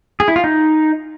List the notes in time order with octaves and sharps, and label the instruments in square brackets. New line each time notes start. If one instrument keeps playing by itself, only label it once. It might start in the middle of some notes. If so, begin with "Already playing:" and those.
[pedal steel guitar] G#4
E4
F4
D#4